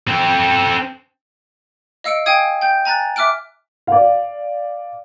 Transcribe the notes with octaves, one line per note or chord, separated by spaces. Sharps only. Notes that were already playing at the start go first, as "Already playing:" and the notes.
C4 A4
D#5 F5 E6 C#7 D7
F5 G5 G#5 D#6 G#6
G5 G6
G#5 A#5 F#6 A6
E5 D6 F6 F#6 D7
D5 F5